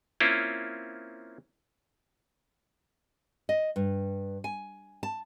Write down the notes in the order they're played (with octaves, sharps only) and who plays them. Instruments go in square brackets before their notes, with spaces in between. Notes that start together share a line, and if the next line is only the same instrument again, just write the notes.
[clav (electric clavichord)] A#3 C4 C#4 E4 F4
[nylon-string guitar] D#5
G2
G#5
A5